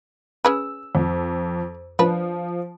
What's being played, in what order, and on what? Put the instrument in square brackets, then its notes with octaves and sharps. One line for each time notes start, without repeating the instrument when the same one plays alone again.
[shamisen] C#4 G#4 B4 [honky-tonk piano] E6
[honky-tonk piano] F2
[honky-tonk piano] F3 [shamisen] D4 B4